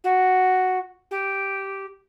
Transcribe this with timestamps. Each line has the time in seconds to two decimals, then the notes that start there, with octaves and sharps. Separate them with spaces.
0.03 F#4
1.10 G4